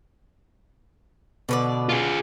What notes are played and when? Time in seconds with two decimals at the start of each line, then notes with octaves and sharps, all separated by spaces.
1.49 B2 D3 B4 D5
1.89 F4 G#4